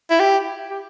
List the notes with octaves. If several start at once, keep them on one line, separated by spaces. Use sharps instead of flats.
E4
G4
G4